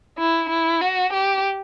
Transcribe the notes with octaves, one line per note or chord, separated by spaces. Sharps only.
E4
E4
F#4
G4